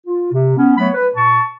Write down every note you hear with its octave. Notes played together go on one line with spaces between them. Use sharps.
F4
C3
B3 C#4
F#3 A3 B3 C#5 B5
B4
A#2 A5 C#6